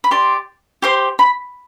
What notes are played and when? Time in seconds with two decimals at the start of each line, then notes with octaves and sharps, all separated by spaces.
0.04 B5
0.11 G4 D5 C6
0.82 G4 C5 C6
1.19 B5